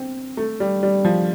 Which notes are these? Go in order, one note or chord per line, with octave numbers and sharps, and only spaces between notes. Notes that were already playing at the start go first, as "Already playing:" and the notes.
Already playing: C4
A3
G3
G3
F3